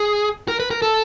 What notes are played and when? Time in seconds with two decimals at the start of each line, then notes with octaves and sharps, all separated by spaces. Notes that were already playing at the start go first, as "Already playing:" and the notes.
Already playing: G#4
0.48 A#4
0.60 B4
0.71 A#4
0.82 A4